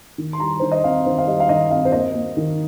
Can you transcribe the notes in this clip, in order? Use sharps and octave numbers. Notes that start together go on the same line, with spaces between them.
D#3
C6
G3 A#5
D#3 C5
D#5
C4 F5
D#3 C5
F5
G3 D#5
F5
D#3 D#5
C4 F5
C5
A#3 D#5
A#3
D#3